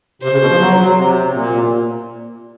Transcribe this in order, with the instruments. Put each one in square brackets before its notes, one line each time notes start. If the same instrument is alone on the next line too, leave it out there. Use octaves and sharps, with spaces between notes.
[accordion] C3 [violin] C5
[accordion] C#3
B2
F3
F#3
F#3
C3
A#2